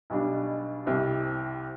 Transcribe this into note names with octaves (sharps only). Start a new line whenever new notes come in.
B1 B2 G3 D4
C2 C3 G3